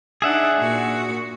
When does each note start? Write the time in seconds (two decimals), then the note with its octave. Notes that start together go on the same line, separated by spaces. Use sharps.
0.22 D4 D#4 G#4 E5 F#5
0.59 A#2 F#4